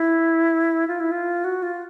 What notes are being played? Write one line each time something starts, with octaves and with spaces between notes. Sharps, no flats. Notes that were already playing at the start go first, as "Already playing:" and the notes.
Already playing: E4
F4
E4
F4
F#4
F4